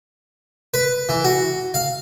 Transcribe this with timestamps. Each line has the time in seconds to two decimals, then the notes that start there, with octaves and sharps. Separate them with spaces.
0.74 B4
1.09 E3
1.25 F#4
1.74 F5